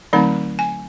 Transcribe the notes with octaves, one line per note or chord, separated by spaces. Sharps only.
D3 F#3 A3 C4 D#4 B5
G#5